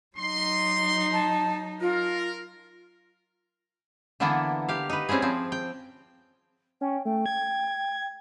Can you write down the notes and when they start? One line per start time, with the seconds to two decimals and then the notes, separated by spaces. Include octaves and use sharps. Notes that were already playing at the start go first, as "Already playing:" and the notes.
0.17 F#3 D#4 C6
1.13 A5
1.81 F4 A#4
4.20 D3 E3 A#3 B3 D4 E4
4.69 G4 F5
4.90 D#4 B4
5.09 G3 C4 C#4 E4 G#4
5.22 F3 C4
5.52 G5
6.81 C#4 G5
7.05 A3 G5
7.26 G#6